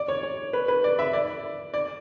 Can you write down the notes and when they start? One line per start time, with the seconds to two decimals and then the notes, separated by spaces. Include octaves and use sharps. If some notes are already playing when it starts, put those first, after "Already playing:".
Already playing: D5
0.08 C#5
0.23 C#5
0.53 B4
0.68 B4
0.84 D5
0.99 E5
1.13 D5
1.74 D5